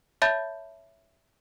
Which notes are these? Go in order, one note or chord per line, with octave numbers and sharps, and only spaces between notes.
C#5 E5 A5 B5 G6 A6